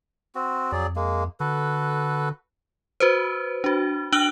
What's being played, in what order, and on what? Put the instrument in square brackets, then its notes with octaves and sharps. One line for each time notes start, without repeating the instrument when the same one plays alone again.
[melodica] C4 F#4
[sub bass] F2 [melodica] F#3 G#4 D5
[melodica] G#3 A#3
[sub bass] D3 [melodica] F#4 A4 B4
[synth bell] F#4 B4 C5
D4 F#4
D4 E6 F#6 D7 F#7 G7